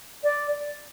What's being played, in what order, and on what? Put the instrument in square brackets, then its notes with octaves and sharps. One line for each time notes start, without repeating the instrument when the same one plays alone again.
[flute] D5